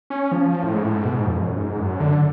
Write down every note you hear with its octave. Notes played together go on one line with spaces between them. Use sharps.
C#4
F3
F3
A2
G#2
A2
G#2
B2
G#2
F2
F#2
G#2
F#2
D3